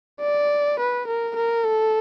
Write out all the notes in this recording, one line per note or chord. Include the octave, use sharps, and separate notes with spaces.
D5
B4
A#4
A#4
A4